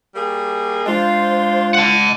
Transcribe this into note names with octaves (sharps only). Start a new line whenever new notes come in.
G3 A#3 G#4
G#3 D4 F4 C5 C6
F#5 A5